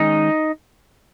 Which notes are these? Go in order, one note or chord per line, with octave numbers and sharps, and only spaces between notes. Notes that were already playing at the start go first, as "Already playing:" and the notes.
Already playing: D#3 G#3 C#4 D#4